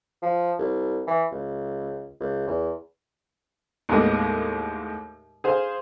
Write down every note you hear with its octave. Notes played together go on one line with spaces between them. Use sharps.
F3
C2
E3
C#2
C#2
E2
D#2 A2 G#3 A#3 B3 D#5
G#4 C5 F5